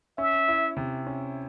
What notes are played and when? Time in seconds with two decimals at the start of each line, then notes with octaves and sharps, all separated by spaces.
0.18 C#4 E5
0.48 E4
0.77 C3
1.07 C#4